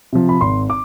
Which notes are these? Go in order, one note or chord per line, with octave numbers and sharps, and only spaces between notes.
C3 F3
B5
G#1 C6
D6